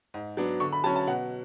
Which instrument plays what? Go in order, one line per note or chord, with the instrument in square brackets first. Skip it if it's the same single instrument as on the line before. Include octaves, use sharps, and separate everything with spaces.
[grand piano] G#2
F#3 B3 D4
D3 C#6
B5
F#3 C#4 A5
A5
B2 F#5